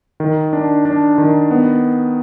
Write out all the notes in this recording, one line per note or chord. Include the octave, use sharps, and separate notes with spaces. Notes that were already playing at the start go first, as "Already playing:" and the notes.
D#3
D4
D4
D#3
B3